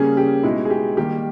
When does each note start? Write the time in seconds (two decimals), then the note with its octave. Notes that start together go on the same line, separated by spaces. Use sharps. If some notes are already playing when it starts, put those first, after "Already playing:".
Already playing: C#3 G3 A#3 C#4 G#4
0.17 G4
0.43 B2 G#3 D#4 E4
0.65 G#4
0.70 G4
0.97 D#3 G3 A#3 G4